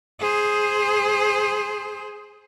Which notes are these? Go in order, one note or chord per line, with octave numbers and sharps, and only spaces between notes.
G#4 C5